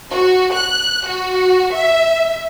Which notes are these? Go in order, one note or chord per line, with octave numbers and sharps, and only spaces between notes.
F#4
F#6
F#4
E5